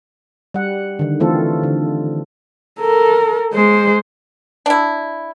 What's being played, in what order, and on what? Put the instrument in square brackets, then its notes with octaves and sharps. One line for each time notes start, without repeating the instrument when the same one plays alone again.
[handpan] G3 F#5
D3 D#3
E3 A3 C4 F4 A4
D3
[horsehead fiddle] A4 A#4
G#3 C5
[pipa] D4 E4